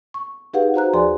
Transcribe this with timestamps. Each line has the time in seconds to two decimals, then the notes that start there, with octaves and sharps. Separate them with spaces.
0.14 C#6
0.54 D#4 G4 G#4 B4 F5 F#5
0.74 F#4 C5 A#5 F#6
0.93 D#2 F3 G#4 D5 G#5 C6